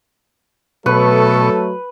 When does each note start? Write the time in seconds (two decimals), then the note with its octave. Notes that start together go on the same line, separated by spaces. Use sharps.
0.86 B2 F#3 A3 A4 B4 C#6